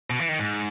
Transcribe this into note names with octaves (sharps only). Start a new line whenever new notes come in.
B2
E3
D#3
G#2